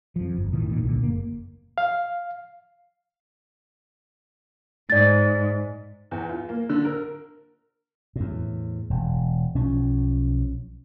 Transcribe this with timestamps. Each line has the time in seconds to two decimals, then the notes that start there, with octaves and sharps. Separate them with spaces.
0.16 F2 F3
0.36 G1
0.52 E2 A2 D#3 E3
0.70 A1 A#2 D#3
0.84 C#2 A#2 D3
1.02 F#1 A#3
1.78 F5
4.90 G#2 D5 A6
6.11 E2
6.29 F4
6.49 A#3
6.69 D3
6.85 A#4
8.16 E2 A2
8.90 E1
9.55 B1 F3 C#4